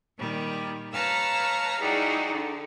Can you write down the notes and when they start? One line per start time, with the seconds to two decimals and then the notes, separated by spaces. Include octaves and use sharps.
0.18 A#2 D#3 G3
0.93 B4 C#5 F5 A5 A#5 E6
1.79 G3 D#4 E4 F#4 G#4
2.31 D3